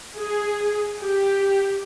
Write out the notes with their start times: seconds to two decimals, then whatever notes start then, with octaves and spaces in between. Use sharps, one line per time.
0.17 G#4
1.03 G4